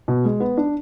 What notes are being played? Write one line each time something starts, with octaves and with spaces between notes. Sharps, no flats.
B2
G#3
B3
D4